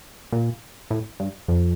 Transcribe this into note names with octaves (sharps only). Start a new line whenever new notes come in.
A#2
A2
G2
F2